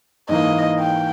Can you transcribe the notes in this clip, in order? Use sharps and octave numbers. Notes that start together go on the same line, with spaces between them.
G#2 E3 A#3 D#5
G5